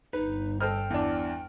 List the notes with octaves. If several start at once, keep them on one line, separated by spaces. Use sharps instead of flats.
G1 D#4 B4
A4 C5 D#5 G5 F6
E2 D4